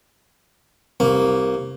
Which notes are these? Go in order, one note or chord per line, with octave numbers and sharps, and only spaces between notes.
C2 A#3